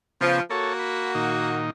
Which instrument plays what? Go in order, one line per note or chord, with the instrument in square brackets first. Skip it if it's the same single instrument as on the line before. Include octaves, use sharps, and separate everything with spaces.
[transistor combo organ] C#3 B3 F4 [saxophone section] F3
[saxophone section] A#3 F#4 [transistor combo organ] A4 C#5
[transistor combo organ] B5
A#2 D#3 D#4